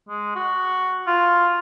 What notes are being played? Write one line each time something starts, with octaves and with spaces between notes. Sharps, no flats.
G#3
F#4
F4